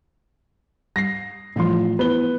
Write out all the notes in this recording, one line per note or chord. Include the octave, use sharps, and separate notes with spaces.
G3 A#6 C7
A2 E3 F3 G3 F4 C6
B3 E4 B4 G7